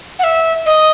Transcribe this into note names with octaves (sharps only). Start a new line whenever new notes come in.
F#5
E5
D#5